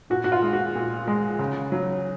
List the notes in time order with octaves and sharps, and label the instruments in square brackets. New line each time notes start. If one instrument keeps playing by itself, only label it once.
[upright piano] A#2 F#4
F#4
F4
G#3
F#4
A#2
G#3
C#3
F#3